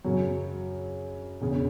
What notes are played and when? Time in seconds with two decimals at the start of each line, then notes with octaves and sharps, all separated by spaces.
0.04 F#2 C#3 F#3
1.41 E1 E2 C#3